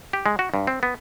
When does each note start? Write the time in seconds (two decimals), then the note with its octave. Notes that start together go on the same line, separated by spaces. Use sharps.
0.13 G4
0.26 G#3
0.39 F#4
0.54 G2
0.67 C4
0.83 B3